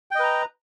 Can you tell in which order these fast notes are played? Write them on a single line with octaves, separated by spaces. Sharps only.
G5 D#5 B4 A#5